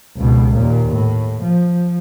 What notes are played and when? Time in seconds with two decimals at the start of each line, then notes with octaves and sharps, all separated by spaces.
0.17 C#2 B2
0.55 D#2 A#2
0.93 A2
1.43 F3